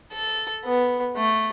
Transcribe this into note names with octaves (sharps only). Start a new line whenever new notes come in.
A4
B3
A3